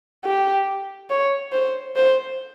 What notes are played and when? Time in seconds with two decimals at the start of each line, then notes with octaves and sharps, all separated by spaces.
0.25 G4
1.10 C#5
1.53 C5
1.96 C5